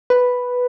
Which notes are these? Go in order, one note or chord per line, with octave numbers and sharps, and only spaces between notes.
B4